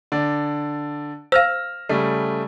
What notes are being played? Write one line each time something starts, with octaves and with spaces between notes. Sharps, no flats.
D3 D5
C5 F5 E6 F6 A#6
C#3 G3 A3